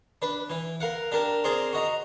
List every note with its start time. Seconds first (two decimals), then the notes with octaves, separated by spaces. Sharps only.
0.22 D4 B4
0.50 E3
0.80 A#4 F5 F#5
1.12 D4 G4 A#4 A5
1.44 C4 G#4 A#4 D5
1.73 F#4 D#5 A#5